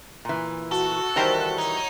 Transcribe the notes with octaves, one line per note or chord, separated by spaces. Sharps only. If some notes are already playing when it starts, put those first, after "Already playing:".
A#2 E3
F#4 A4
D#3 E3 G3 A#4 C5
D#4 C#5